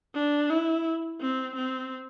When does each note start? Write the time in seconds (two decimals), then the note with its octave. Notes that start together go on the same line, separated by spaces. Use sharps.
0.15 D4
0.50 E4
1.20 C4
1.56 C4